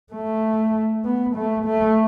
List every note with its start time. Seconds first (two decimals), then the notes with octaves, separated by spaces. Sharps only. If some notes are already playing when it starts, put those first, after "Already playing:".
0.13 A3
1.05 B3
1.36 A3
1.66 A3